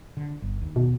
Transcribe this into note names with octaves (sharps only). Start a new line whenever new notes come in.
D3
G1
D#2
B2